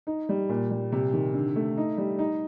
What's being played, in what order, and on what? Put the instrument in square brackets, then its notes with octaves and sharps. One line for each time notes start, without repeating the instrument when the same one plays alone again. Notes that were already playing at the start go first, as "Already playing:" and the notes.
[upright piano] D#4
G3
A#2
G3
C3
D#3
D3
A3
D#4
G3
D#4